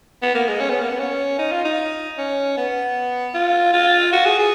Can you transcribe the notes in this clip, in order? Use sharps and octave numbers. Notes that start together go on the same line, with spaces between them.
B3
A#3
G#3
C#4
B3
A#3
B3
C#4
D#4
F4
D#4
C#4
B3
F4
F4
F#4
G#4
G#4